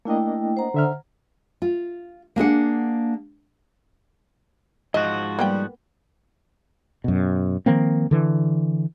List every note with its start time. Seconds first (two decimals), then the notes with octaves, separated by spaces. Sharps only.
0.05 A3 A#3 D4 E4 D#5 G5
0.57 C5 F#5 A#5
0.74 D3 E5 F6
1.62 F4
2.36 A#3 D4 G#4 F#5
4.94 G#2 F3 F#4 D#5
5.39 G3 A#3 B3 G5
7.04 F#2 B2
7.66 D#3 F3 A#3 C4
8.11 D3 E3